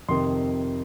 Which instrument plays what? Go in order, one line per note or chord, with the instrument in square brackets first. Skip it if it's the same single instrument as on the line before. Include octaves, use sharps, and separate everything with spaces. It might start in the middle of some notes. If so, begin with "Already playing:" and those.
[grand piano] F2 C3 D#3 C6